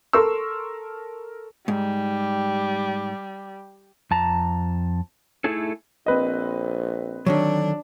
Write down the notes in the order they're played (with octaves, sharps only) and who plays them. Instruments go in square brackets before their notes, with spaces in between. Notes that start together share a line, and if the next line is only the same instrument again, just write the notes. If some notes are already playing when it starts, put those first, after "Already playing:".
[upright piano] A4 A#4 C6 C#6 E6
[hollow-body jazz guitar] G#2 [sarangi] G3
[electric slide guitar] F2 A5 A#5
A3 D#4 E4 G#4 A4
[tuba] A#1 [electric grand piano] C4 B4 D#5
[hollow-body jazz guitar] D3 D#3 F#3 [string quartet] D4